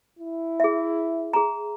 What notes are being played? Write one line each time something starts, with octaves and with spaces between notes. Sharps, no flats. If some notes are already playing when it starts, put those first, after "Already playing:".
E4
G#4 E5
G#4 A#5